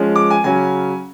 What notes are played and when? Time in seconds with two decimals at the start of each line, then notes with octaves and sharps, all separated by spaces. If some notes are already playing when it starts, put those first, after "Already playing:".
Already playing: F3 G#3 C#4
0.16 D6
0.30 G#5
0.44 C#3 F#3 C#4 G#5